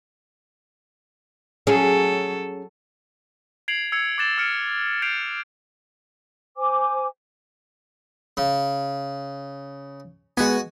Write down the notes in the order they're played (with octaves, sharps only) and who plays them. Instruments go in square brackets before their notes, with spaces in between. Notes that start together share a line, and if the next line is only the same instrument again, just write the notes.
[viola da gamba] F#3 A4 [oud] C#4 G#4
[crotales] G#6 C7 D7 F7 F#7
E6 G#6 C7 C#7 F7
D6 F#6 A6 E7 G7
E6 F6 C#7 D7
G6 A6 C7 D7 F7
[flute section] C5 G#5 D6
[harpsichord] C#3
[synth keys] G#3 B3 [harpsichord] F#4 G#5